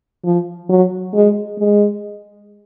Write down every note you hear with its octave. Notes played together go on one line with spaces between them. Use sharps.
F3
F#3
G#3
G#3